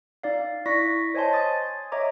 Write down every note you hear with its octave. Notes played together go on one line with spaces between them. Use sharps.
D#4 D5 F5
E4 D5 C#6 A#6 B6
C5 C#5 D#5 G#5 A5 C6
G#5 C6 D#6 A6
C#5 D#5 E5 A#5 D6